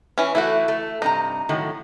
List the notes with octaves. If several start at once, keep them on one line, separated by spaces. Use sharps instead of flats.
E3 C#4
E3 A3 E4 F#4
A3
G2 C3 D#4 A#5
A2 D#3 F#3